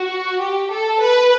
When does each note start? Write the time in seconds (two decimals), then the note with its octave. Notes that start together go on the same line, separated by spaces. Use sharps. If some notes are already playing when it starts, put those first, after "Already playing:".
Already playing: F#4
0.40 G4
0.71 A4
1.01 B4